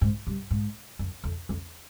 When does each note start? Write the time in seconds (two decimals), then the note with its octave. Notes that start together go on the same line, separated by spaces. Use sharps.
0.01 G#2
0.27 G2
0.51 G#2
0.99 F#2
1.24 F2
1.49 F2